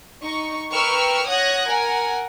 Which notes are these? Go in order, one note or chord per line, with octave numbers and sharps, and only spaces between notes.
D#4 C#6
A#4 B4 G5 C#6 E6 F6
C#5 F#5 D#6 F#6 G#6 A#6
A#4 F#5 G#5